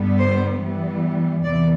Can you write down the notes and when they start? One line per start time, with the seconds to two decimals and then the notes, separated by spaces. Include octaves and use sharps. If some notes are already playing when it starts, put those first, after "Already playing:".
Already playing: G2 D3 G3 B3
0.19 C5
0.60 G2 E3 G3 B3
1.44 E2 C3 E3 B3 D5